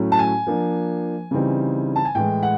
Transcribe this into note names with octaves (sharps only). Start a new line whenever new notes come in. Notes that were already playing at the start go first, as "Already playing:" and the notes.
Already playing: A2 F#3 A3 C#4
A5
G#5
F3 A#3 D4
C#3 E3 G3 C4 D#4
A5
G#5
A2 E3 G#3 G5
F#5